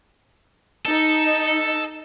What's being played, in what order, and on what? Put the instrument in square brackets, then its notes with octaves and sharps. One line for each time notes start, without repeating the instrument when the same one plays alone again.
[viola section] D#4 [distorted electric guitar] A4